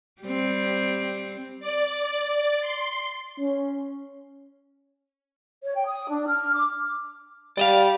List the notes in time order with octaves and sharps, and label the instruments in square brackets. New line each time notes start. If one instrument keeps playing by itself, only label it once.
[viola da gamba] G3 C4
[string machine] D5
C6
[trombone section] C#4
[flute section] C#5
G5
D#6
D4
F6
D6
[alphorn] G3 [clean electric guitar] D5 D#5 F5